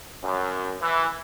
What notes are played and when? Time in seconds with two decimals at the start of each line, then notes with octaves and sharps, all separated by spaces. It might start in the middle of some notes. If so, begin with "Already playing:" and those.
0.24 F#2
0.81 E3